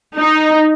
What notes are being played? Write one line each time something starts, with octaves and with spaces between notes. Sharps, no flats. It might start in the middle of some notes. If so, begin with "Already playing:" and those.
D#4